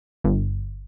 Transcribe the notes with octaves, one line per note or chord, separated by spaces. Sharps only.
G1